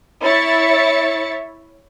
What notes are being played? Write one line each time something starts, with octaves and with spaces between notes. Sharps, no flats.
E4 C#5 E5 A6 C#7